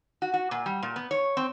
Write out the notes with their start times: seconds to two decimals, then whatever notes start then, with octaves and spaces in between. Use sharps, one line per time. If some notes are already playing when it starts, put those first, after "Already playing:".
0.22 F#4
0.34 F#4
0.51 A#2
0.66 G3
0.82 A#2
0.96 B3
1.11 C#5
1.37 C4